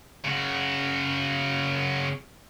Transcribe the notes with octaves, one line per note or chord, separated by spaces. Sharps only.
C#3 F#4